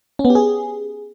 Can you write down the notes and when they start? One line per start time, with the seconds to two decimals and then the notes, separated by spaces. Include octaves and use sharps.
0.19 C#4
0.25 B3
0.30 G4
0.35 G#4